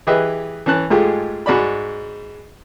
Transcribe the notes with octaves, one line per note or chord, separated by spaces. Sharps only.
E3 G4 G#4 B4 D#5 E5
E3 C#4 A5 F#6
G#2 G#3 A3 F4 G4 G#4
G#2 F#4 D5 B5